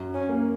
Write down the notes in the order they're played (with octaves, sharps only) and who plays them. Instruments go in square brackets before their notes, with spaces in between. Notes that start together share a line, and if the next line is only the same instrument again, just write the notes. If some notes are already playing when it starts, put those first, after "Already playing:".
Already playing: [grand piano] F#2
[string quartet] C#4
[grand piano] A#3